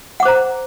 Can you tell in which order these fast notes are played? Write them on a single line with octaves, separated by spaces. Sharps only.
F#5 D6 C5 A#5